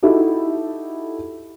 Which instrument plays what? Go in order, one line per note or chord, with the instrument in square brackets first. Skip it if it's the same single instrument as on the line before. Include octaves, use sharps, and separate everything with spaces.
[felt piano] D#4 E4 F#4 G4 A4